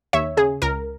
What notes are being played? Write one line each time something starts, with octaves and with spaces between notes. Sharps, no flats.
D#2 C#5 E5
C#3 G#4
C#2 A#4